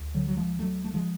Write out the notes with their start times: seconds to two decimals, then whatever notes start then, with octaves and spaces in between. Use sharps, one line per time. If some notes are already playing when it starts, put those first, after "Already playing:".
Already playing: D2
0.14 D3 F#3
0.27 F#3
0.37 F3 G#3
0.59 F#3 A3
0.84 A3
0.94 F3 G#3